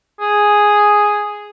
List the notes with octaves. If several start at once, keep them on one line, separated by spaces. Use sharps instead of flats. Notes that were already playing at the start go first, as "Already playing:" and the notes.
G#4